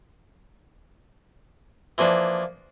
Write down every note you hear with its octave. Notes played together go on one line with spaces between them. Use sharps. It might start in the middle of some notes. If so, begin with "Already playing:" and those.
E3 F3 A#3 D4